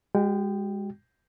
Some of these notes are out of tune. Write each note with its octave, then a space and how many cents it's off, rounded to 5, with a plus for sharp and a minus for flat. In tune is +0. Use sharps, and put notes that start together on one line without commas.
G#3 -30 F#4 +20 G5 +0